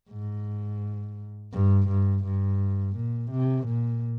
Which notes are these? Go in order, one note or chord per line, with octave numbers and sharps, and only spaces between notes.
G#2
G2
G2
G2
A#2
C3
A#2